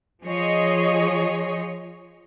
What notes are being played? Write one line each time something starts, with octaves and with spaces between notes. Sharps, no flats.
F3 G#4 C#5 D#5